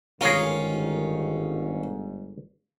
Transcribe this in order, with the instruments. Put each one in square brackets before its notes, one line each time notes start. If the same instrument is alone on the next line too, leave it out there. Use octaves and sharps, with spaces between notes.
[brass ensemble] G1 G#2 [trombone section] D#3 [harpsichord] C#4 F4 [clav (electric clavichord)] G#4 A#4